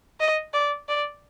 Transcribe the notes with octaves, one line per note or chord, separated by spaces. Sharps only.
D#5
D5
D5